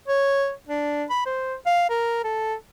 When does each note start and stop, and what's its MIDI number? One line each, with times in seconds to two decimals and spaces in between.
0.08 0.52 73
0.69 1.05 62
1.10 1.21 83
1.26 1.55 72
1.66 1.88 77
1.90 2.21 70
2.24 2.55 69